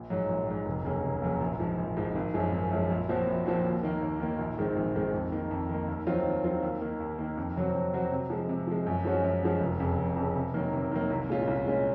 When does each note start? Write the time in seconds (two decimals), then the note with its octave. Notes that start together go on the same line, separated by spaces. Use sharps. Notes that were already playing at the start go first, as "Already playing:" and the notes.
Already playing: A#1
0.10 G#2 F#3
0.29 A#1
0.48 G#2 F#3
0.66 F1
0.85 D#2 C#3 F#3 A#3
1.03 F1
1.22 D#2 C#3 F#3 A#3
1.41 A#1
1.59 G#2 F3
1.78 A#1
1.97 G#2 F3
2.15 G#1
2.34 F#2 F3 G#3
2.53 G#1
2.71 F#2 F3 G#3
2.90 A#1
3.08 A#2 F3 C4 F#4
3.27 A#1
3.46 A#2 F3 C4 F#4
3.64 D#2
3.83 D#3 A#3
4.02 D#2
4.20 D#3 A#3
4.39 A#1
4.58 G#2 D#3 G#3 C4
4.76 A#1
4.95 G#2 D#3 G#3 C4
5.13 F2
5.32 D#3 A#3
5.51 F2
5.69 D#3 A#3
5.88 D#2
6.07 D#3 F#3 C4 F4
6.26 D#2
6.44 D#3 F#3 C4 F4
6.63 D#2
6.81 D#3 A#3
7.00 D#2
7.19 D#3 A#3
7.37 F2
7.56 C3 F#3 C4 F#4
7.75 F2
7.93 C3 F#3 C4 F#4
8.12 C3
8.30 F3 G#3
8.49 C3
8.67 F3 G#3
8.86 F#2
9.05 F3 G#3 C#4 F#4
9.24 F#2
9.42 F3 G#3 C#4 F#4
9.61 F1
9.80 F2 C#3
9.98 F1
10.16 F2 C#3
10.36 C3
10.54 D#3 F#3 A#3
10.73 C3
10.92 D#3 F#3 A#3
11.10 C2
11.29 A#2 G#3 C#4 F4
11.47 C2
11.66 A#2 G#3 C#4 F4